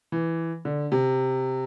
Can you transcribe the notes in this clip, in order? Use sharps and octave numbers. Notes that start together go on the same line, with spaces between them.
E3
D3
C3